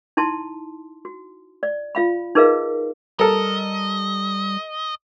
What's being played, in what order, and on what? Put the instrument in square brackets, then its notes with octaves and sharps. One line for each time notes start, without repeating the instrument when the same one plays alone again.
[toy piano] D#4 E4 A5 C6
F#4
D5
F4 F5 B5
D#4 G#4 A#4 B4 D#5 F5
[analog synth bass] G3 [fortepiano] A4 A#4 [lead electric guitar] D#5